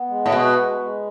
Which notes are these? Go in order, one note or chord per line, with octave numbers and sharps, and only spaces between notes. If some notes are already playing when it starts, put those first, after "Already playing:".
Already playing: B3
G#3
A2
B2 F#4
G#3
G#3